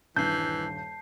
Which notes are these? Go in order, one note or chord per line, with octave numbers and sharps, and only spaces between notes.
D#1 G2 E3 A5 G6 C7